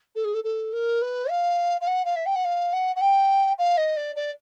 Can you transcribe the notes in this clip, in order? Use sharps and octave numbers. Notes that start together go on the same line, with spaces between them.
A4
G#4
A4
A4
A#4
B4
F5
F5
F#5
F5
E5
G5
F#5
F5
F#5
F#5
G5
F5
D#5
D5
D5